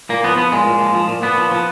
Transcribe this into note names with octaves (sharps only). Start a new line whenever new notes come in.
A#2 A#3
F3 B3
F3 B3
A#2 G#3
A#2
F3
F3
A#2
A#2 B3
F3
F3